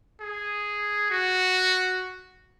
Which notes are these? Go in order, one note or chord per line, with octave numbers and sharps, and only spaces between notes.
G#4
F#4